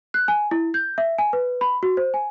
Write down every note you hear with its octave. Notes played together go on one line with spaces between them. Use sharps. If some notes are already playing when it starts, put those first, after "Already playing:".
F#6
G#5
E4
G6
E5
G#5
B4
B5
F#4
C5
G#5